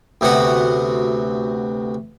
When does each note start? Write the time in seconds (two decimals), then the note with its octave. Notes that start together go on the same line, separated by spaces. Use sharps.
0.21 D2 C3 B3 F#4 F#5